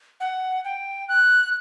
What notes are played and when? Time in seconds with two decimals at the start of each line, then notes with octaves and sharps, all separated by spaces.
0.20 F#5
0.65 G5
1.09 F#6